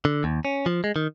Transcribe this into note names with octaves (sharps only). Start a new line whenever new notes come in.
D3
D#2
C#4
F3
G#3
D#3